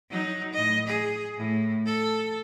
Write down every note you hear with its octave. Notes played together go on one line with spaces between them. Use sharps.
F#3 D#4
A2 D#5
G#4
A2
A4